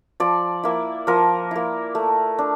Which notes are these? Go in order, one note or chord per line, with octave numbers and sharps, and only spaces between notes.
F3 D5
A#3 E4
F3 A#4
A#3 E4
A3
D4